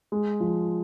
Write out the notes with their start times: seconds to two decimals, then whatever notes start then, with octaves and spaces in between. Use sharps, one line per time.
0.12 G#3
0.40 F3